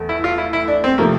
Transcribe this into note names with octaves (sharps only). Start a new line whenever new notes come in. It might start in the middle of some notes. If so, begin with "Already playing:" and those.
Already playing: E2 A3
E4
F4
E4
E4
D4
C4
C3 F3 A3 A#3